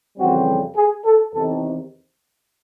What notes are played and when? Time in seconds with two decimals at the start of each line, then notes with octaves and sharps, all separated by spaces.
0.18 F2 C#3 E3 G3 C4 F#4
0.76 G#4
1.05 A4
1.34 E2 C3 D#3 A4